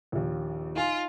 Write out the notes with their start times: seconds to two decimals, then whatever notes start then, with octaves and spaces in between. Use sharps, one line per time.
0.12 A#1 D#2
0.75 D#4 F4 F5 G#5